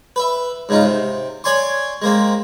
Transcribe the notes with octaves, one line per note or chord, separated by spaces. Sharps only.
B4 E5
G#2 C#3 D#4 F4
C3
C#5 D5 G#5 C6 C#6
G#3 A#3 C4